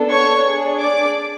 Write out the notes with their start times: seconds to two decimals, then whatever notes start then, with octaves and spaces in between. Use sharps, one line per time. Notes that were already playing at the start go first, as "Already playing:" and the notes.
Already playing: B3 D4 A4
0.10 C#5 C#6
0.45 D4 G#4
0.82 D5 D6